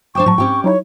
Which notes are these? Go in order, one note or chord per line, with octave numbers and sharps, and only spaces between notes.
D4 C5 G5 C#6 D6 G6
A2 F#3 A5
G#2 C4 C#4 G4 G5
F#3 D#4 E4 C#5